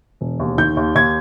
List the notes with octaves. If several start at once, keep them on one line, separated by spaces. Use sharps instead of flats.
E1
D#2
D#3 G6
D#2
D#2 G#6